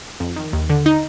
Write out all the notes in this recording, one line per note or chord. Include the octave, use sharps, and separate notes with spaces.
F2
D#3
D#2
D3
D#4